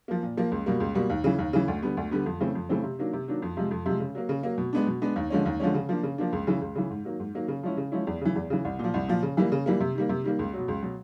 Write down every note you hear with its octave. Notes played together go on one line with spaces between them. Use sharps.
F3 A#3
A#2
F3 A#3
C#2
B2 G3 A#3
C#2
B2 G3 A#3
D#2
C#3 E3
D#2
C#3 E3
D2
D3 G3 B3
D2
D3 G3 B3
F2
C#3 E3 A3 C4
F2
C#3 E3 A3 C4
C3
D#3 F#3 A#3 D4
C3
D#3 F#3 A#3 D4
F2
C3 F3 G#3
F2
C3 F3 G#3
C#3
F#3 A#3
C#3
F#3 A#3
B2
G#3 B3 D4
B2
G#3 B3 D4
D#2
D3 F3 G#3 C#4
D#2
D3 F3 G#3 C#4
C#3
F3 A#3 D4
C#3
F3 A#3 D4
C#2
C#3 E3
C#2
C#3 E3
G#2
D#3 F#3 A#3
G#2
D#3 F#3 A#3
C#3
F3 G#3 C#4 E4
C#3
F3 G#3 C#4 E4
E2
C#3 E3
E2
C#3 E3
C2
A#2 F3
C2
A#2 F3
C#3
E3 G3 A#3
C#3
E3 G3 A#3
C3
D#3 G3 A#3
C3
D#3 G3 A#3
C#2
B2 F#3
C#2
B2 F#3